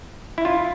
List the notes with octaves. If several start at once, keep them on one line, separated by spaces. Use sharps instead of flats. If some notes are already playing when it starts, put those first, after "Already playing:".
E4
F4